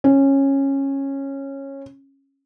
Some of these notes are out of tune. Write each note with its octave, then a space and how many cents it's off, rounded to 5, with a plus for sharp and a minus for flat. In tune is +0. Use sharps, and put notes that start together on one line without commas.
C#4 -15